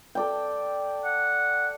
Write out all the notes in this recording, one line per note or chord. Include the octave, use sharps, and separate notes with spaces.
A4 D5 G5
F#5